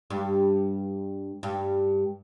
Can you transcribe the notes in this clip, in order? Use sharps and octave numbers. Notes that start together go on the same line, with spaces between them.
G2 G3
G2 G3